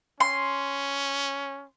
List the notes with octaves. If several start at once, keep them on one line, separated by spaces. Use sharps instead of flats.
C#4 C6